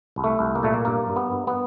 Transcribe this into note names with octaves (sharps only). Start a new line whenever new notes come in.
C2
A3
C2
A#3
A#2 A3
A#3
G2 A#3
G2
B3
G2
B3